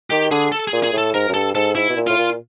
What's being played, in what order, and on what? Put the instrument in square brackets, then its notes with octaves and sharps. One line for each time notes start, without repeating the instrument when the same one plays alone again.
[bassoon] D#3 [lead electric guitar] G4
[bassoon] D3 [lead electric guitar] G#4
[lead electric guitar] A4
G#4
[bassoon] A#2
[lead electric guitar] G#4
[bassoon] A2
[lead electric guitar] A4
[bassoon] G#2 [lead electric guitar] A#4
[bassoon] F#2
[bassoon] G2 [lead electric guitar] A4
[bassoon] G#2 [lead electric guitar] A4
[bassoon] G#2 [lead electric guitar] E4
[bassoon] B2
A#2
[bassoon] A2 [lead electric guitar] F4
[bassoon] A#2